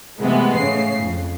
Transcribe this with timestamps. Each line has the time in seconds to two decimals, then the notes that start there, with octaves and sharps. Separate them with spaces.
0.20 C3 E3 G#3 A3 B3
0.57 A2 C#3 C7
1.02 F2